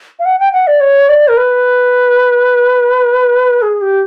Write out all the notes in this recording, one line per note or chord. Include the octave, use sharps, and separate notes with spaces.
F5
F#5
G5
F#5
D5
C#5
D5
A#4
B4
G#4
G4